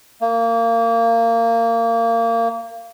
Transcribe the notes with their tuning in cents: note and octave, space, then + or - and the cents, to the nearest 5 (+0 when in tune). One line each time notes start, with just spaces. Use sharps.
A#3 -20